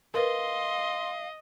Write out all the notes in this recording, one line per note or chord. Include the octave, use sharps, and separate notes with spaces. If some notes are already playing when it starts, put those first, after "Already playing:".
A#4 B4 D#5 F5 C6